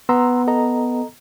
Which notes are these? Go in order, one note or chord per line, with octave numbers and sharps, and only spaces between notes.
B3 A#5 C6 E6
A4 D#5 A#5